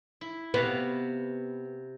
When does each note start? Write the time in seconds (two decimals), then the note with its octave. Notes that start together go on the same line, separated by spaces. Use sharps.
0.21 E4
0.54 C3 B3 F#4 F5